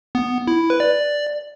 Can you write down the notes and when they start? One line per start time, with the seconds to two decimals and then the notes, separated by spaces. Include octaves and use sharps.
0.15 B3
0.47 E4
0.70 B4
0.80 D5